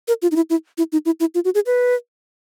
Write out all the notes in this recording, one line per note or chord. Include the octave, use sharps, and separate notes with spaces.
A#4
F4
D#4
E4
E4
E4
D#4
E4
E4
F4
F#4
G#4
B4